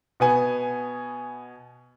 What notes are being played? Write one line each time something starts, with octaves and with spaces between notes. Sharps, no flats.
B2 B3 G#5